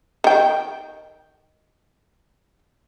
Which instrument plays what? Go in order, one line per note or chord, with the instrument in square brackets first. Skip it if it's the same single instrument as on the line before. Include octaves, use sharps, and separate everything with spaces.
[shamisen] D#3 G5